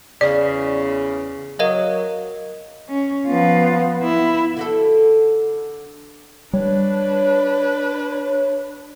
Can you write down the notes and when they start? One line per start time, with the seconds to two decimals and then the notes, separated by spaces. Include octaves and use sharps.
0.21 E2 C#3 D5
1.59 F#3 A#4 D#5 F5
2.89 C#4
3.27 F3 B3 F4
4.02 E4
4.57 D3 F#4 A4
6.53 G3 D4 B4 C#5